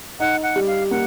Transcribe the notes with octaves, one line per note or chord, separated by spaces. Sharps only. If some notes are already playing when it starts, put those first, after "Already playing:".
D#4 F#5
F#5
G3
F5
A#3 F#5